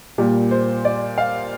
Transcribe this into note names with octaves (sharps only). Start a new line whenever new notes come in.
A#2 G3 A#3 G4
C5
D5
F5